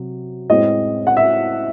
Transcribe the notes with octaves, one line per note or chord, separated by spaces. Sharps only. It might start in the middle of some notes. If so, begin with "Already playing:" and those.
Already playing: C3 F#3
A2 G#3 C4 D#5
F#5
E5